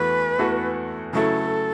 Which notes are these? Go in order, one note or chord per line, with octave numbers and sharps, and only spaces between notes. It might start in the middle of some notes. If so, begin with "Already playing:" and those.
Already playing: E2 E3 A3 F#4 B4
E2 E3 A3 F#4 A4
C#3 F#3 A3 E4 A4